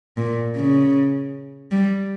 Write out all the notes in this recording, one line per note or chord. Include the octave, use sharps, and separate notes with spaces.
A#2
C#3
G3